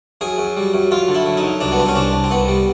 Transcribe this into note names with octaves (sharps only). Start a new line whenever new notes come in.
F#2 G#4
F#2
G3
F#2
F#2 F4
D3
E4
F#2
D#4
F#2
C2 D4
B3
C2 C4
C#4
C2 D4
C2
C4
C2 B3
G3